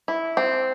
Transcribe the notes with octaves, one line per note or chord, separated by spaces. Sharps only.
E4
C4